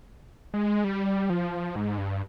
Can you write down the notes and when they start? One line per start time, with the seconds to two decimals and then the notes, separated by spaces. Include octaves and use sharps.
0.54 G#3
0.84 G3
1.30 F3
1.76 G#2
1.98 G2